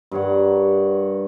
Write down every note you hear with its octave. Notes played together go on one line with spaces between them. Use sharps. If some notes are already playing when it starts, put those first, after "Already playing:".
G2 A#4 C#5 F#5